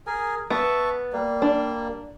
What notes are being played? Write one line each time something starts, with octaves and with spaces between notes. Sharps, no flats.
G#4 A#4 G#5
B3 E5 A5 C#6
G3 A#3
D4